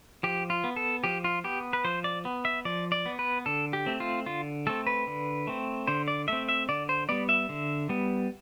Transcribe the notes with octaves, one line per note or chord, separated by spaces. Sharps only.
F3 G4
F4
B3
A4
F3 G4
F4
B3 G4
B4
F3 C5
D5
B3
E5
F3 D5
D5
B3
B4
D3 A4
G4
A3 C4
F4
D3 F4
A3 C4 A4
B4
D3
A3 C4
D3 C5
D5
A3 C4 E5
E5
D3 D5
C5
G3 B3 D5
E5
D3
G3 B3